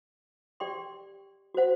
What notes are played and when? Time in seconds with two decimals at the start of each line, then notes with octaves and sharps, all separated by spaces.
0.60 G4 D5 G5 C6
1.54 F#4 C5 F#5